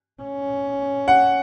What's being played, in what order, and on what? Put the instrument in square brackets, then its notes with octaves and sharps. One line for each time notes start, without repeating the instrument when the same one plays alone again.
[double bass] C#4
[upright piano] F#5